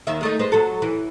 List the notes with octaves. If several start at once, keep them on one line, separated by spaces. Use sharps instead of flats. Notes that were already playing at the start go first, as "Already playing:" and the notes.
D#2 D#3 E5
G#3 A3 D#4
G#3 B4 C5
F#3 A4
E3